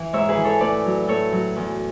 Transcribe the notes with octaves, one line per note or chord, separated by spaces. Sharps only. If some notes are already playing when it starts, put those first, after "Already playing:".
Already playing: E3 E4
G#2 C#5 E5
G#4 B4
E3
A4 C#5
A2 B4 D5
F#3
A2 A4 C#5
F#3
E2